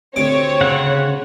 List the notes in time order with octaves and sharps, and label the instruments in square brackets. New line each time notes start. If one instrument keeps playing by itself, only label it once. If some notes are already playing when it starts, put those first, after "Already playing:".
[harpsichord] D2 C3 D6 [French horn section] C4 [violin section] C#5
[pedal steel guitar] C#3 F#5